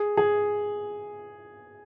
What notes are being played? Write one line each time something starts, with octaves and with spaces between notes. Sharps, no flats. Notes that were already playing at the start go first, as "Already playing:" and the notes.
Already playing: G#4
G#4